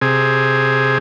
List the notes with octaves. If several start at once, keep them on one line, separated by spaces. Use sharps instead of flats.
C3 G#4